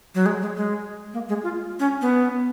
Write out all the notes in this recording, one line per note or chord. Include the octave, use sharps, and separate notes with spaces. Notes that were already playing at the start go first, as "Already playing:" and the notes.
F#3
G#3
G#3
G#3
A#3
G#3
F4
C#4
B3